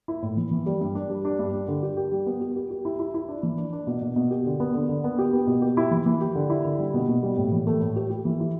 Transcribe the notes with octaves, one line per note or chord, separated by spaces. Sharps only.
E4
A2
E3
E3
G3
G2
D4
G3
D4
G2
D4
D3
G4
G4
G3
B3
G4
G4
G4
E4
E4
E4
D4
E3
D4
D4
B2
B2
B2
G4
D3
B3
D3
D3
B3
G4
B3
B2
G4
E4
E3
E3
G4
D3
E4
D3
G3
B2
B2
G3
A2
E3
A3
A2
G4
G4
E3
E4